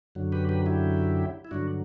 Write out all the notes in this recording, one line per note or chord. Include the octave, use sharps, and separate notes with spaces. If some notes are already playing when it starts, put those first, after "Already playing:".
F#2 D3 F#3
G4 B4
G4 B4
E4 G4
E4
G2 D3 F#3 D4 F#4